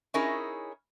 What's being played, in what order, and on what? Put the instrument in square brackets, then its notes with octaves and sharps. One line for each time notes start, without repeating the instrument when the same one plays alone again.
[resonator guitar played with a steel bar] C#4 D#4 E4 G#4 A#4 C#5